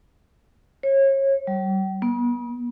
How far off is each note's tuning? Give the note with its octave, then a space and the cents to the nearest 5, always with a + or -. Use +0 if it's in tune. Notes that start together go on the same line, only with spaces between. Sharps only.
C#5 -30
G3 -40
B3 -40